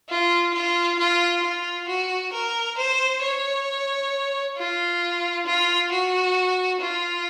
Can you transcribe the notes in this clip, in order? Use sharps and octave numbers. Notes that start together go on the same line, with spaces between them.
F4
F4
F4
F4
F#4
A#4
C5
C#5
F4
F4
F#4
F4